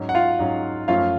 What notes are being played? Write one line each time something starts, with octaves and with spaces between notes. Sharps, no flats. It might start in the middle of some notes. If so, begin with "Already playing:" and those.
Already playing: G#2 F#3 C#4
F#5
F4 F5
G#2 F#3 C#4
F#2 F3 A3 C#4 F4 F5